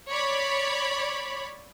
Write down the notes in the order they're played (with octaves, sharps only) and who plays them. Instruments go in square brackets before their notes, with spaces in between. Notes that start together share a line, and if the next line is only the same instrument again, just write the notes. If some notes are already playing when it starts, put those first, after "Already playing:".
[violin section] C#5 D5 B5